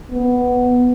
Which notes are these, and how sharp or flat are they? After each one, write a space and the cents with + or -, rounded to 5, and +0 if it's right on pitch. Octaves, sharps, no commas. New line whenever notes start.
B3 +5